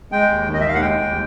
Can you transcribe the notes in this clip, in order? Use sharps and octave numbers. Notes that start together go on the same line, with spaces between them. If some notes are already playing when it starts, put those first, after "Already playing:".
G#3 G5
D#2
D#3
D#5
E5
D#2 F5
F#5
G#3 G5
D#2